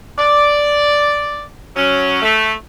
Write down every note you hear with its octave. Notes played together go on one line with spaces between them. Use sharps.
D5
F#3 C#4
A3